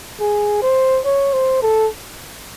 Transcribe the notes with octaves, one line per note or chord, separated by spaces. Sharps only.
G#4
C5
C#5
C5
A4